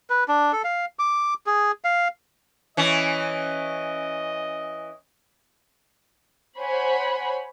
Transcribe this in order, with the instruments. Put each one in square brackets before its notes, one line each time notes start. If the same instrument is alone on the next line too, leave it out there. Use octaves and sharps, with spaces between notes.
[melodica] B4
D4
A4
F5
D6
G#4
F5
[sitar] E3 C#4 [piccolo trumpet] D#5
[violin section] C5 C#5 F#5 G#5 B5